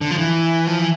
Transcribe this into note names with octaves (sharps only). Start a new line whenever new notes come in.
D3
F3
E3
F3
E3